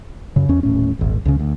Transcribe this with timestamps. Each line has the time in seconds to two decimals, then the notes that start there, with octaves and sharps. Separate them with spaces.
0.36 F#2 C#3
0.49 E2 C#4
0.63 D#1 A2 C#4
0.99 D#1 G#1
1.25 C#2 C#3
1.39 D2